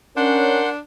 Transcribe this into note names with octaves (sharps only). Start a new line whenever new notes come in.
C#4 D4 A#4 F#5 C6 G6